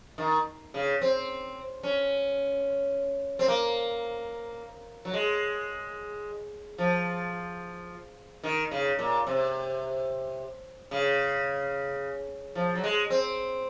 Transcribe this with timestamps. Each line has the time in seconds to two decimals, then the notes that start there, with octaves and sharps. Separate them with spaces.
0.18 D#3
0.74 C#3
1.02 C4
1.83 C#4
3.39 C4
3.48 A#3
5.05 F#3
5.13 G#3
6.78 F3
8.44 D#3
8.71 C#3
8.99 A#2
9.27 C3
10.91 C#3
12.55 F3
12.75 F#3
12.84 G#3
13.10 C4